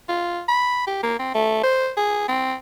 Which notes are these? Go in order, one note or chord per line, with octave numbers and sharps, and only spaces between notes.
F4
B5
G4
A#3
C4
A3
C5
G#4
C4